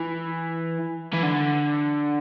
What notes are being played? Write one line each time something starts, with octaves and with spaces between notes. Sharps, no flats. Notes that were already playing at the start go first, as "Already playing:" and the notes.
Already playing: E3
E3
D3